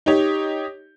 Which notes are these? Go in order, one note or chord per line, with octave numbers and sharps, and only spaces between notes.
D#4 G4 C#5